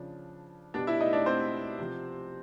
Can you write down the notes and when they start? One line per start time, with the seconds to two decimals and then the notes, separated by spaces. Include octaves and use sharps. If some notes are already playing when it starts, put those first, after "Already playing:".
Already playing: C#3 F3 D4
0.74 B2 G3 D4 D5
0.87 E4 E5
1.01 D#4 D#5
1.13 D4 D5
1.26 C4 C5
1.79 C3 F3